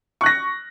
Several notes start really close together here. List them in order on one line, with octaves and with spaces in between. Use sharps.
C#6 F#6 A#6